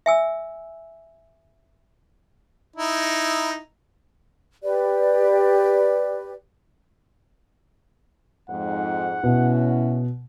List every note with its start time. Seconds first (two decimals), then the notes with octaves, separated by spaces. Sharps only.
0.06 E5 G#5 E6
2.76 D#4 E4
4.63 G4 B4 D5
8.49 F2 G#2 F#5
9.24 B2 C#4 E4 F#4